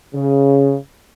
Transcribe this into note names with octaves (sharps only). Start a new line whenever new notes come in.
C#3